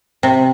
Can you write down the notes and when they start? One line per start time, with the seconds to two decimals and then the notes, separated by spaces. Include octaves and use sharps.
0.23 C3